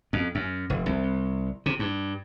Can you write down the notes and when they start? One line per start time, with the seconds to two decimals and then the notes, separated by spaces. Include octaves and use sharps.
0.13 F2
0.35 F#2
0.70 F1
0.86 C2
1.66 C3
1.79 G2